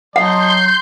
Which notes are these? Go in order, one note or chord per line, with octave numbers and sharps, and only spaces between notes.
F#3 D#5 F#5 A5 C6 G6